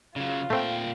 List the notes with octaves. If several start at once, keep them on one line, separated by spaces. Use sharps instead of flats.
C#3 F#3 F4
A#2 A3 C4 G5